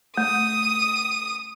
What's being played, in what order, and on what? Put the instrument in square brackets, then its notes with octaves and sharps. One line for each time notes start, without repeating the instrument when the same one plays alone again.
[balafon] A3 [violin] D#6